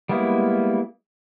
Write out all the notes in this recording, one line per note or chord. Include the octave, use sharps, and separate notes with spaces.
G3 G#3 A#3 B3 E4